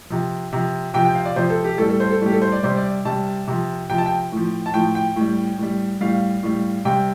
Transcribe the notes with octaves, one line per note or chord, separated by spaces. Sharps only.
C3 F3
C3 F3
C3 F3 G5
G5
F5
D5
C3 F3 C5
A4
G4
A2 G3 A4
A4
C5
A4
A2 G3 G4
A4
C5
D5
C3 G3 C5
D5
C3 G3 A5
C3 F3
C3 F3 G5
A5
G5
A2 F3
A5
A2 F3 G5
G5
A2 G3
A2 G3
A2 G3 F5
A2 G3
C3 G3 G5